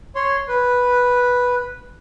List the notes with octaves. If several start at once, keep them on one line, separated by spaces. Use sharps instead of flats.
C#5 C6
B4